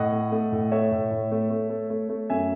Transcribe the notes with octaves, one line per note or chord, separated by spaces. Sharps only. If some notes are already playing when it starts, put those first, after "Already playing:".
Already playing: A2 D#5 F#5
A3
A3
A2
A3 C#5 E5
A2
A2
A3
A3
A3
A3
A3
F#2 E5 G#5